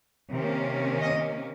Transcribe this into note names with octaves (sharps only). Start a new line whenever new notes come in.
C3 D#3 A#3 C#4
D#5